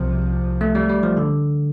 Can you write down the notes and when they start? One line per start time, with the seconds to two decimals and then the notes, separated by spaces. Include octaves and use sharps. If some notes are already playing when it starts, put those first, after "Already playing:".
Already playing: C2 C3 F3
0.61 A3
0.75 G3
0.89 G3
1.03 F3
1.17 D3